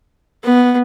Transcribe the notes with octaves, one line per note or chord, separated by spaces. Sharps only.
B3